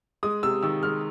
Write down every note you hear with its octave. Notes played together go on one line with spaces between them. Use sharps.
G#3 D#6
C3 E6
D#3 E6
G#3 F6